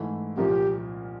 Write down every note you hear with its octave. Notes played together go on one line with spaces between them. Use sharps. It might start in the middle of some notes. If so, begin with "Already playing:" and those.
Already playing: G#2 E3 A3
C2 A#2 F3 A#3 G4